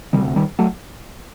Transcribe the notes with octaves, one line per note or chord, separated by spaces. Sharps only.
D2 C3 D#3 G3
D#3 G3
F#3 A3